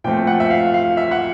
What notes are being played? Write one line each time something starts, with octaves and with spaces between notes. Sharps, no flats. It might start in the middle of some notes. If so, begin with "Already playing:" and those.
A#2 F3 A3 C4 G5
F#5
E5
F5
F5
E5
F#5